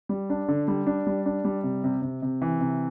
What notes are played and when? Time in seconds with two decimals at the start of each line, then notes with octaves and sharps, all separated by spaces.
0.09 G3
0.30 D4
0.48 D3
0.68 G3
0.87 D4
1.07 G3
1.26 D4
1.45 G3
1.63 C3
1.84 C3
2.02 C3
2.22 C3
2.42 E3
2.61 C3